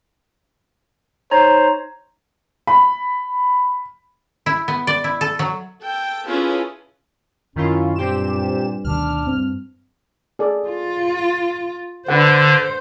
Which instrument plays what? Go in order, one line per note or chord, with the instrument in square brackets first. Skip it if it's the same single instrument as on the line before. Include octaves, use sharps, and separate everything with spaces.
[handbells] D#4 C#5 A#5 [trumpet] C5
[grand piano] B5
[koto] E4
B3
D5
E4
A4
F#3
[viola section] A4 G5
C#4 E4 F4 G#4 A4 B4
[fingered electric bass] F#2 [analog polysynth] D#3 E4 F4 [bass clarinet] C#4
[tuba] G2 [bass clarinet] A#2 [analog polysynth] C4 G4 E7
[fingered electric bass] D2 B2 D#3 [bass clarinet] D4 [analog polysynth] F6
[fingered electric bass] G2 [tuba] C4
[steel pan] G#4 A4 D5
[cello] F4
[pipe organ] D3 [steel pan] D4 B4 F#5 [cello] C5